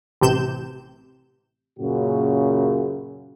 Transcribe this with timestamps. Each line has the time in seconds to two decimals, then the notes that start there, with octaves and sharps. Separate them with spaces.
0.21 A1 C3 G6 E7
1.79 F#2 A#2 C#3 F#4